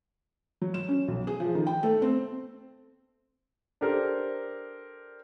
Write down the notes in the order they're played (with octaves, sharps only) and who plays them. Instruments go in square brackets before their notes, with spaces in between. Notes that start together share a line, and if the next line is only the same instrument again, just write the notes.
[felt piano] F#3
E7
C#4
B1
G#4
F3
D#3
G5
A3
C4
[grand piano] D4 G4 A4 A#4 C5